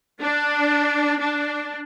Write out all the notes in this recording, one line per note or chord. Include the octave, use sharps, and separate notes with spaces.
D4
D4